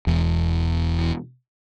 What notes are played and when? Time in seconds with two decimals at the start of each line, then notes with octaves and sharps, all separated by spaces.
0.07 E1 E2